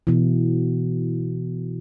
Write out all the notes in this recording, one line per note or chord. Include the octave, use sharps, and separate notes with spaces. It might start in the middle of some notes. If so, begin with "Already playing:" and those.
B2 E3